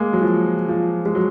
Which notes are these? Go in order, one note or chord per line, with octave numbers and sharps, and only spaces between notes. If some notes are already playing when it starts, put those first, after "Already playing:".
Already playing: G#3 A#3
F#3
F3
F3
G#3
F#3